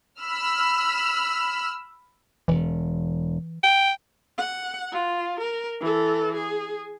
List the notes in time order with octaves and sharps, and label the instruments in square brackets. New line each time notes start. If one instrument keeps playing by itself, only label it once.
[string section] B5 E6 F6
[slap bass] E1 [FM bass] E3
[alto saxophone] G5
[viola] F#5
F4
A#4
E3 A4
G#4